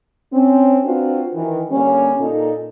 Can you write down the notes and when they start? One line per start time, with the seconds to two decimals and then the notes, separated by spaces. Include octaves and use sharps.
0.33 C4 C#4
0.84 C4 D4 F4 F#4 B4 C5
1.34 D#3 E3
1.70 D3 G3 A#3 C#4
2.19 A#2 D#4 A4